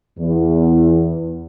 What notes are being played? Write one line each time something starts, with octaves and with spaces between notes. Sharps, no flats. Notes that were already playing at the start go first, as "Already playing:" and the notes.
E2